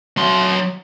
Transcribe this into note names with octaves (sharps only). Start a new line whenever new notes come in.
F#3 C6